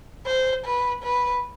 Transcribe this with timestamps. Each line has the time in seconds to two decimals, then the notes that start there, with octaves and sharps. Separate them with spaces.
0.26 C5
0.65 B4
1.03 B4